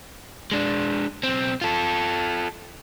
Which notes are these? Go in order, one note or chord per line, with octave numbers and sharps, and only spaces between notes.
G#3 D4
B1 C4
F4 A4